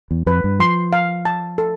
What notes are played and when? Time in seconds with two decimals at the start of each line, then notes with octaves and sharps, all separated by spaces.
0.11 E2
0.26 F2 B4
0.44 G2
0.59 F3 C6
0.93 F5
1.25 A5
1.58 A4